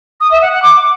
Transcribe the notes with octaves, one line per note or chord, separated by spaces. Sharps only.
D#6
E5
F#5
F#5
D6